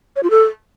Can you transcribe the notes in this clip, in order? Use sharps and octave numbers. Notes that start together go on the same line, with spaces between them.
C#5
F4
A4